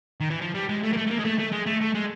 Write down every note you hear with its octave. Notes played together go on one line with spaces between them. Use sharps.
D#3
E3
F3
G3
G#3
A3
A#3
A3
A3
A#3
G#3
A3
A3
G#3
A3
A3
G#3